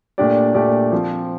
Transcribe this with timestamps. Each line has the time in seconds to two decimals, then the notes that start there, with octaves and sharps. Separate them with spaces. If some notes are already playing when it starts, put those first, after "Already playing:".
0.18 A#2 A3 D4 G4 D5
0.54 A#2 A3 D4 G4 D5
0.92 F3 C4 F4